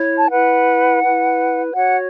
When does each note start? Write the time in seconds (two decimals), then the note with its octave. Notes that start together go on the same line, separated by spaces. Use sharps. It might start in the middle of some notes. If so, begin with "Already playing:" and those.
Already playing: E4 C#5
0.18 A5
0.28 E4 B4 F#5
1.01 E4 B4
1.75 F#4 C#5 F#5